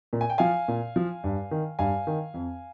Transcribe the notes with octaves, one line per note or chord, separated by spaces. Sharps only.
A#2
G#5
G5
F3 F5 G#5
A#2
F3
G2
D#3
G2 F5 G#5
D#3
F2